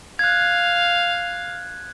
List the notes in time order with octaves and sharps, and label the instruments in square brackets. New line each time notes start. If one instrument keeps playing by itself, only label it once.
[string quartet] F5 [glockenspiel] F#6 G#6